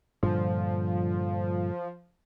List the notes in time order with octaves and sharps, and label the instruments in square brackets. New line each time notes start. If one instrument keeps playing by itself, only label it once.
[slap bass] G2 A#2 D3 [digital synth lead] F3